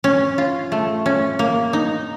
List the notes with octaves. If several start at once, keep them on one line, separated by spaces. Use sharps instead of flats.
C#4
F4
A3
C#4
A#3
D#4